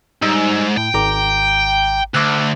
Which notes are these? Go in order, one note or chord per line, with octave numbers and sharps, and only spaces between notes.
G#2 G3 D#4 E6
A2 G5
G#1 A#5 D6
D2 D6 E6 F#6